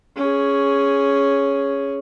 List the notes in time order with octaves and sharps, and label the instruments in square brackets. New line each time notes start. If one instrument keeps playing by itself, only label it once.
[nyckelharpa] C#4 G#4